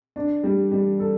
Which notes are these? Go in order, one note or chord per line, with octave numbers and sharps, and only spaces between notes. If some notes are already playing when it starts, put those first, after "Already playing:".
D4
G3
G3
A4